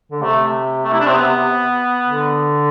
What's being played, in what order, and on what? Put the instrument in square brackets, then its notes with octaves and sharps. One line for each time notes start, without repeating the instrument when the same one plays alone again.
[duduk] D3
[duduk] C3 [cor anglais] A3
[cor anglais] A3
E4
D4
C4
B3
[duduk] D3